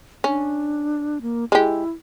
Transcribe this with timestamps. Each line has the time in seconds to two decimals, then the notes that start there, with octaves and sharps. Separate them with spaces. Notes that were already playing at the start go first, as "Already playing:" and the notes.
0.24 C#4 D4
1.22 A#3
1.52 G#3 E4 G4